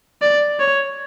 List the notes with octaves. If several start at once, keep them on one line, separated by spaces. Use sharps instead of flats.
D5
C#5